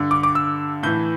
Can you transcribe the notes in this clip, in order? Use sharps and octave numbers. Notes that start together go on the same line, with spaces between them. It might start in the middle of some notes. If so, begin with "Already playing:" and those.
Already playing: G2 D3
D6
D6
E6
A2 E3 G6